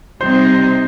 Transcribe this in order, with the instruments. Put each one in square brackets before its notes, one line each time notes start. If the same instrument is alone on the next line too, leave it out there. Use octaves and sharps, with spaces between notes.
[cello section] C3 G3 C4 D#4 [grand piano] C5